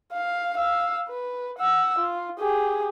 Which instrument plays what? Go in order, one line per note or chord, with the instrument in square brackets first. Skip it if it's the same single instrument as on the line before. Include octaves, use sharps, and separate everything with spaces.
[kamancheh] F5
F5 E6
B4
F#5 E6
F4
G4 G#4